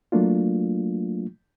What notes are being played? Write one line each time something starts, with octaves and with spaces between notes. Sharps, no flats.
F#3 A3 A#3 D4 F4